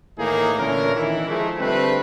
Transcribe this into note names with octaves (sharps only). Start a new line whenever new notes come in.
A2 D#3 E3 A#3 D#4 G#4
A#2 D3 E3 C#4 A#4
D#3 E3 E4
F3 G#3 A3
D3 G3 A3 C4 B4